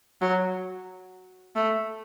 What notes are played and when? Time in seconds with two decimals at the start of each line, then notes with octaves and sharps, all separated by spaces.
0.21 F#3
1.56 A3